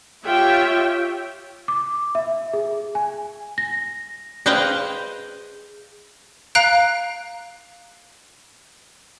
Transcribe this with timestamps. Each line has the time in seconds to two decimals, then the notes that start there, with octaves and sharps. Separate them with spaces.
0.24 F4 G4 C#5 E5 G5
1.68 D6
2.15 E5
2.53 G#4
2.95 G#5
3.58 A#6
4.46 G#4 B4 C5 D#5 F5 G5
6.55 F5 A#5 F#6 D7